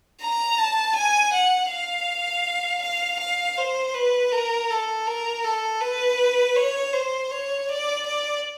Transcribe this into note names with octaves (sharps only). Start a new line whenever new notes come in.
A#5
A5
G#5
F#5
F5
F5
F5
C5
B4
A#4
A4
A#4
A4
B4
C#5
C5
C#5
D5
D5